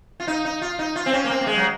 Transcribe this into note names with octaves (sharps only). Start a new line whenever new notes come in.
F4
D#4
D#4
F4
D#4
F4
C4
C#4
A#3
C4
A#3
G#3
F#3